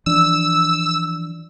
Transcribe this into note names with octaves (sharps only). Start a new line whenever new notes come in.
E3 F3 D4 E6